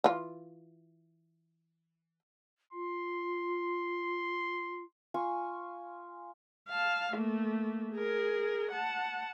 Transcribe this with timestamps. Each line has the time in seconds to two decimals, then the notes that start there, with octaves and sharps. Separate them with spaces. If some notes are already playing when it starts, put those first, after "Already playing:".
0.04 E3 F4
2.73 F4 C6
5.14 F4 G#5 C#6
6.69 F5 A5
7.14 A3 A#3
7.92 G#4 A#4
8.72 F#5 A5